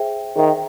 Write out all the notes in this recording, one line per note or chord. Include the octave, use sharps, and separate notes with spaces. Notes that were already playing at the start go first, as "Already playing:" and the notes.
Already playing: G#4 C5 E5 G5
D#3 G#4 C5 E5 G5